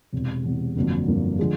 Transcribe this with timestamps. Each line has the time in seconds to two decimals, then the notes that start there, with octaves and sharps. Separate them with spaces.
0.13 E1 E2 C3
0.44 E1 E2 C3
0.76 G1 F2 D3 F#3 A#3
1.07 G1 F2 D3 F#3 A#3
1.39 D3 F3 G#3